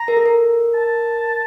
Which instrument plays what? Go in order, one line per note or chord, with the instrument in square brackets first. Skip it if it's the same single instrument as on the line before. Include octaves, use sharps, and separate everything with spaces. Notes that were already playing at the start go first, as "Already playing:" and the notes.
Already playing: [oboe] A#5
[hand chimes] A#4
A4
A#4
[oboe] A5